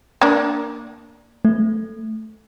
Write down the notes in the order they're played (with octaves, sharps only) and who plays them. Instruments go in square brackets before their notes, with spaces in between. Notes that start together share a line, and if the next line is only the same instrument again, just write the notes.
[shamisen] A#3 D4
[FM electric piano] A3